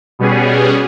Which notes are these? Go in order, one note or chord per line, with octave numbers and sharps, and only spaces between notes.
B2 G3 B3 C#4 G#4